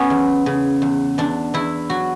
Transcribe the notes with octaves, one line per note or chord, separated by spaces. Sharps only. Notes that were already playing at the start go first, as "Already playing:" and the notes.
Already playing: B3 C#4
E2
C#3
E2
E2 D4
E2 E4
F#3 F#4